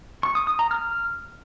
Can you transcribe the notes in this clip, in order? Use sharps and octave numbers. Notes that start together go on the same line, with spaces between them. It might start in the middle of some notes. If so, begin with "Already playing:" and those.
C#6
D#6
D#6
A#5
F6